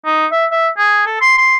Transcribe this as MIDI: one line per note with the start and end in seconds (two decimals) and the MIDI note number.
0.05 0.26 63
0.31 0.45 76
0.51 0.68 76
0.78 1.03 68
1.06 1.16 69
1.21 1.37 84
1.38 1.57 84